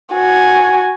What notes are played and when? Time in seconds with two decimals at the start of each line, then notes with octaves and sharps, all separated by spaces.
0.13 F#4 G#5